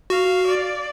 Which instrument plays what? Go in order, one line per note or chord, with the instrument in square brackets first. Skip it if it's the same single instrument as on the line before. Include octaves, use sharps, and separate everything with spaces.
[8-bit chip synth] F#4 [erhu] F5
[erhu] D5